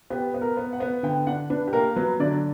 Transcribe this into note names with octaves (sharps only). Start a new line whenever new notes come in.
B3 G4
B3
A#4
B3
F#5
B3
D3 G5
D4 F#5
D4 B4
G4
A#3 A#4
F#3 B4
D3 D5